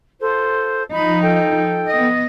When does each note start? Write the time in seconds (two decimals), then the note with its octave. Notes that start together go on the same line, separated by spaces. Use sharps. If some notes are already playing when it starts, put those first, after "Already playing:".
0.20 F4 A4 C5
0.91 F3 D#4 B5
1.21 A4 G5
1.89 B3 D#5